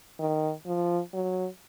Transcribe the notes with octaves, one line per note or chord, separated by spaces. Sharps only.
D#3
F3
F#3